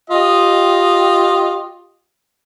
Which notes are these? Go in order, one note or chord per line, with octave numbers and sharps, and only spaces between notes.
F4 G4 D#5